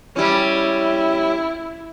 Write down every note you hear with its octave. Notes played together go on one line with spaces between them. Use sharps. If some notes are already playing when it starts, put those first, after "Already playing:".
G3 C#4 E4